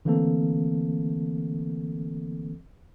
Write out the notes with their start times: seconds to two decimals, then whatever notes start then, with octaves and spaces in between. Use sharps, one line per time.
0.05 D3 E3 A3 A#3 C4 A4